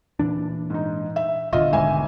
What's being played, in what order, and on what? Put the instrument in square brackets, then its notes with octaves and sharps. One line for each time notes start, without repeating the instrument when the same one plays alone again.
[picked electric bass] A#2 E3 D4
[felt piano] G#2 D#4
E5
[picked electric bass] D#1 B2 D3 [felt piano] F4 D#5 E5
[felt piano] G#1 E5 G#5